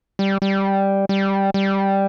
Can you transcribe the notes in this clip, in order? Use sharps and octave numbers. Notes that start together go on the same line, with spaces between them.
G3
G3
G3
G3